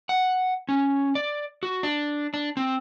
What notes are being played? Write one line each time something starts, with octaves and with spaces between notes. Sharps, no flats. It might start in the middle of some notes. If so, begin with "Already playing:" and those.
F#5
C#4
D5
F#4
D4
D4
C4